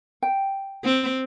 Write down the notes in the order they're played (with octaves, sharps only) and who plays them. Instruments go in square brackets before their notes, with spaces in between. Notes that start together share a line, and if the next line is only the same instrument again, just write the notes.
[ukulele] G5
[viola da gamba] C4